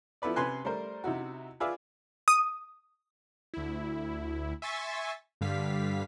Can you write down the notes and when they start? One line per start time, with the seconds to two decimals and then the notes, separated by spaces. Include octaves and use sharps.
0.22 F3 B3 E4 A4 B4 D5
0.36 C3 B4 G#5 C6 F#6
0.65 G3 A3 A#4 C5
1.04 C3 D#4 E4 F#4
1.60 F4 G#4 B4 D5 E5 F5
2.28 D#6
3.54 D2 E4
4.62 E5 G#5 C6 C#6 A6 B6
5.41 G2 D3 G3 F5 B6